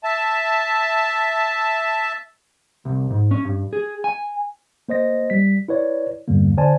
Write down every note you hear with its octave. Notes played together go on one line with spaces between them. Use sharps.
E5 A5
C2
G#2
C#4
G2
G#4
G#5
A#3 C5 D#5 A#6
G3 B6
E4 B4 C#5 D5
E2 G2 D3 G3 A#3
D3 C5 D5 G#5 A5